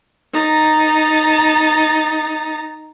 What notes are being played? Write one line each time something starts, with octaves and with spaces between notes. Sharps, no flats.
D#4 A#5 A6